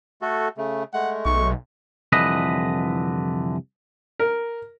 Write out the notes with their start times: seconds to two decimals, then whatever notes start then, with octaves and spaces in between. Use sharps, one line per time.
0.22 A3 F#4 A4
0.57 C#3 A3
0.94 G#3 A3 F#5
1.25 B1 C#6
2.12 C2 F2 D3 E3 B4 D#5
4.19 A#4